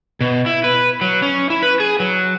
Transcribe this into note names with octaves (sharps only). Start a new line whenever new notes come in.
B2
E4
B4
F#3
C#4
E4
B4
G#4
F#3